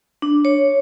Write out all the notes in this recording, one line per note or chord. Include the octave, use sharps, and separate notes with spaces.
D4
C#5